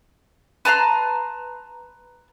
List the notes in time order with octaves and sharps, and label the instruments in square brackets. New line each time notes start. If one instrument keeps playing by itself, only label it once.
[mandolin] B4 A5 A#5 C6